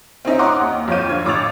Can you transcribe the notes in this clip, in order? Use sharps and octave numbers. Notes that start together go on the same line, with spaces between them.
C4 C#4 D#4 E5
C#5 D#5 F#5 A#5 C6 D6
D#2
F2 F4 C#5 G6 D#7
D3 F4 G#6
A1 D6 E6 A6 F7